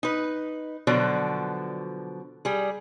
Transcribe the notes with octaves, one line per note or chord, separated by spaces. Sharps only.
D#4 B4
B2 D3 F3 F#3 D5
G3 G#4